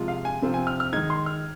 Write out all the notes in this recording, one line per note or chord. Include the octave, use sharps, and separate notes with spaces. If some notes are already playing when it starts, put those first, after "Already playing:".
Already playing: C3 F3 G#3 F4
F5
G#5
C3 F3 C4 F4
G#5
F6
F6
D#3 G#3 D#4 G#6
C6
F6